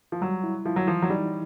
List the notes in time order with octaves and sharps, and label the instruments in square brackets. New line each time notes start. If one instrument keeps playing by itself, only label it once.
[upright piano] F3
[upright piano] F#3 [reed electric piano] G3
[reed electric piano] E4
[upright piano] F3 [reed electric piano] E4
[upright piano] F#3
[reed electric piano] E3 [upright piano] F3
[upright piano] F#3
[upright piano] G3 [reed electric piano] D#4